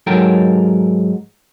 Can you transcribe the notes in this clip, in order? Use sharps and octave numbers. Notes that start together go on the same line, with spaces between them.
G#2 F#3 A4 A#4 G5